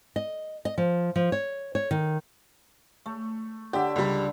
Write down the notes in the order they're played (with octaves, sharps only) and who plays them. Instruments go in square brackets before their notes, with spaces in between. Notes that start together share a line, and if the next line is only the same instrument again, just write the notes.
[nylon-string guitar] D#5
D#5
F3
F3
C#5
C#5
D#3
[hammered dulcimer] A3
[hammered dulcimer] D3 E5 [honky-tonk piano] G4
[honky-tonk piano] C#2 G3